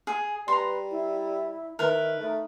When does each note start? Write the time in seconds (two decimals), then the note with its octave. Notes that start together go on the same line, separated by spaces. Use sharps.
0.07 G#4
0.48 G3 B4 A#5 C6
0.91 E4
1.79 D#3 E4 A#4 B4
2.20 A3 D#4